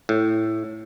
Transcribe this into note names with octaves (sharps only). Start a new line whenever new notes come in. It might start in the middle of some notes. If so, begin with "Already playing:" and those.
A2